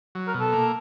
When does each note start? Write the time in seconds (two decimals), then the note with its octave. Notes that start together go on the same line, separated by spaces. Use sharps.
0.15 F#3
0.27 A#4
0.34 B2
0.40 A4
0.52 A#3